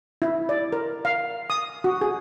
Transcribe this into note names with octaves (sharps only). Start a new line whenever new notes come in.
E4
D5
A#4
F5
D#6
F#4
G#4